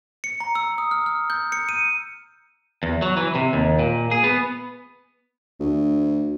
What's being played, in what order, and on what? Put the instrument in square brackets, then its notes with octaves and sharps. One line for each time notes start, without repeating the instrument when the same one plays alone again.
[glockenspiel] C#7
A#5
E6
D#6
F6
F6
G6
C#7
D#7
[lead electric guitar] E2
F#3
E3
C3
D#2
A#2
G#4
B3
[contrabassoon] D2